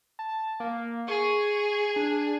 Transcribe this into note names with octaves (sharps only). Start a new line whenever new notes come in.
A5
A#3
G#4 C#6
D4